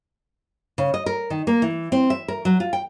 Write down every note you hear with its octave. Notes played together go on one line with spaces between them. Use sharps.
C#3
D#5
A#4
D#3
A#3
E3
C4
E5
A#4
F#3
F4
G5